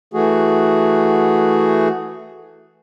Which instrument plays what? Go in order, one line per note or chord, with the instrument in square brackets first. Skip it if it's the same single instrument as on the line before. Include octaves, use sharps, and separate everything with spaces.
[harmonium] E3 A3 F#4 G#4